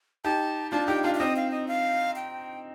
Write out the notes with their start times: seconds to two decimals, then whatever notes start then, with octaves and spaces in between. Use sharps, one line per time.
0.24 D#4 G4 A5
0.72 D4 F4 A5
0.88 D#4 G4 G5
1.04 D4 F4 F5
1.14 F5
1.19 C4 D#4 D#5
1.36 F5
1.51 D#5
1.68 F5
2.16 G5